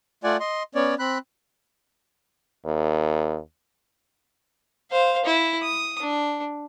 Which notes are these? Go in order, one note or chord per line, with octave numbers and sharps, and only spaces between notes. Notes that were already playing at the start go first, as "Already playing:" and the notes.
A3 F4 D5 F#5 G#5
D#5 C6
B3 C#4 C#5 D5
C4 B5 F#6
D#2
C5 F5
E4
D#6
D4